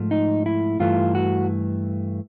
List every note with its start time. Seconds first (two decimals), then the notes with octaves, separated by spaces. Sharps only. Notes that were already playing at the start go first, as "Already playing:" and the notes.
Already playing: G#2 F3 A3
0.11 D#4
0.46 E4
0.80 G2 E3 A3 F4
1.15 F#4